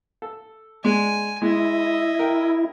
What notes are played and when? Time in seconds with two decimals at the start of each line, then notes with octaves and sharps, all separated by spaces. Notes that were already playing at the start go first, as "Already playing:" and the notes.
0.22 A4
0.84 G#3 D4 G#5
1.42 G#3 E4 D#5 E5
2.19 A#4 G5